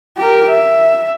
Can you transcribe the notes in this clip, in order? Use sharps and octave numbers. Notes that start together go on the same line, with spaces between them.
G4 A#4
E5